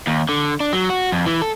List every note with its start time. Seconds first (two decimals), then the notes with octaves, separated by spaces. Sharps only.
0.07 D#2
0.29 D3
0.60 D4
0.73 F#3
0.90 F#4
1.12 F2
1.26 E3
1.42 A4